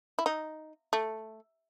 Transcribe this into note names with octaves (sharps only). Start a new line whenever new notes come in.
E4
D#4
A3